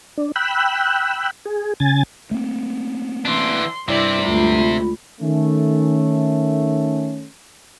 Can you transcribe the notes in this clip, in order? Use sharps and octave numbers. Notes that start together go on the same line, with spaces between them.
D4
G5 B5 E6 F#6
G#4
C#3 G#5 A6
A3 A#3 C4
E3 D4 C6
G2 C3 E4 D5
D2 G#3 F4 B5
D#3 A3 C#4